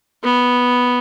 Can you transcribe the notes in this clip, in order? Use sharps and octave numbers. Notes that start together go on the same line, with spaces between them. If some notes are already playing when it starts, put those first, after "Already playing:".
B3